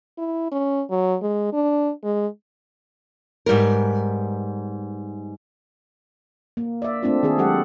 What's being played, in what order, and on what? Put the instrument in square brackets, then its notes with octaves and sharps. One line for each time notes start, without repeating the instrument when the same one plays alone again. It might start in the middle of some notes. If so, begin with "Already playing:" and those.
[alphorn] E4
C#4
F#3
G#3
D4
G#3
[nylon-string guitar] G#2 G3 B3 A#4
[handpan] A#3
D5 E5
A3 C4 D4 F4
D#3 C4 G#4 A4
F#3 G#3 G4 A4 F#5